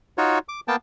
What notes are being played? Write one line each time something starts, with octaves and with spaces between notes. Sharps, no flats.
D#4 F4 F#4 C#5
D6
A#3 B3 G5 A5